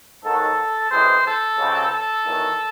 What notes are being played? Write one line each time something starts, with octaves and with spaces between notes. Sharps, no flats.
G#2 D#3 F#3 A4
F#2 E3 G#3 C4 C5
A4
C#2 C#3 F#3 C4
A4
E2 D#3 F#3